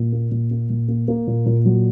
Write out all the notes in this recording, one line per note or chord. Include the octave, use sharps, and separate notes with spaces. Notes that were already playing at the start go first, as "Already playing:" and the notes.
Already playing: A#2
A#3
A#2
A#3
A#2
A#3
A#3
A#2
A#2
F#3